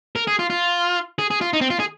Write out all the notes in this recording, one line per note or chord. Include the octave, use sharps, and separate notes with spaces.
A#4
G#4
F4
F4
G#4
G#4
F4
D#4
C4
F4
G#4